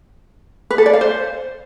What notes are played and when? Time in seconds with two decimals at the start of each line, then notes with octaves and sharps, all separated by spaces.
0.70 B4
0.78 A4
0.86 D5
0.93 F5
1.01 C5